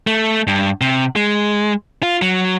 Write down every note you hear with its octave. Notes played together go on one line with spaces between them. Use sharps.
A3
G2
C3
G#3
F4
F#3